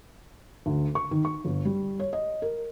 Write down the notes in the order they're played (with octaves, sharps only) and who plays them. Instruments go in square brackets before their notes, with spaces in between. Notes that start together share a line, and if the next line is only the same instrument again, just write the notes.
[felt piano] D2
C#6
D#3
C#6
G1
G3
C#5
D#5
A#4